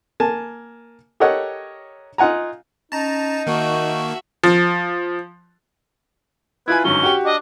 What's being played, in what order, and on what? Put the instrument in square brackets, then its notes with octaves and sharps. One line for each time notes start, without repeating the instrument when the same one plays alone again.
[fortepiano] A#3 G#5 A5
G4 A4 A#4 C#5 D#5 F#5
D#4 F4 F#5 G#5 A#5
[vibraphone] C#4 [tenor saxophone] D#4 [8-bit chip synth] A5 A#5
[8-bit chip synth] D#3 A#3 [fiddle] F#4 E5 [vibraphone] A5 C#6
[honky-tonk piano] F3
[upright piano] E4 F4 G#5 [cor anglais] B4 [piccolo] G#6
[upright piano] G1 G#2 F#3 [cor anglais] C#4 [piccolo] G7
[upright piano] F#4 G4
[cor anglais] D4 [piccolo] D#5